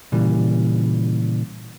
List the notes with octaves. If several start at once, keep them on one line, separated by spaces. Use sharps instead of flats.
A#2 C#3 E3 G3